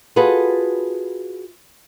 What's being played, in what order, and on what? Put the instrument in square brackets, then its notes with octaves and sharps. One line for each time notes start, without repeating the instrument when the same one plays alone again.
[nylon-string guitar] F4 F#4 G#4 A4 B4